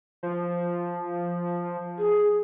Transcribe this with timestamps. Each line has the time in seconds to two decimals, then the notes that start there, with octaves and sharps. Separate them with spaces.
0.23 F3
1.99 G#4